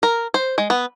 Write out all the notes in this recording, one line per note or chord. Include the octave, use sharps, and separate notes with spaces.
A#4
C5
G#3
B3